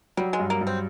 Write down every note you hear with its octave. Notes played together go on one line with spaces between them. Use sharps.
F#3 G3
G#3
G2
A#3
G2
C4